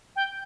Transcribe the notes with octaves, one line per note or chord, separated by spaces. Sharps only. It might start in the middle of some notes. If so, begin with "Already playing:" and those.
G5